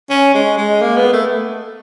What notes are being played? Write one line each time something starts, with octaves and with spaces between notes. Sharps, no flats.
C#4
G#3
G#3
A#3
B3
A3